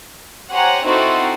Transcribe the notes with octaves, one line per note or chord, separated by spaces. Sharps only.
G4 C5 C#5 F#5 G#5 A#5
C4 D#4 E4 F#4 A4 C5